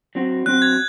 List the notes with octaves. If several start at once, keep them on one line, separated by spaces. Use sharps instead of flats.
F#3 C4 F#4
F#3 C4 F#4 F#6
G#6